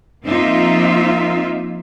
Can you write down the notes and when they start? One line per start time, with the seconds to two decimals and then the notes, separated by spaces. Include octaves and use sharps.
0.25 F3 A#3 C4 D#4 F4 E5